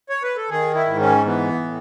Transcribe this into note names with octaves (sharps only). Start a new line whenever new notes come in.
C#5
B4
A4
D#3 G#4
E4
G#2
C#4
E3 B3
A2